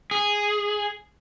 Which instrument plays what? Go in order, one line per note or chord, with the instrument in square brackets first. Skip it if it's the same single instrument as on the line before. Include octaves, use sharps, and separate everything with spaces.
[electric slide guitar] G#4